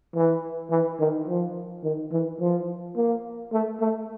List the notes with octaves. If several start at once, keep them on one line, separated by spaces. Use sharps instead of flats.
E3
E3
D#3
F3
D#3
E3
F3
A#3
A3
A3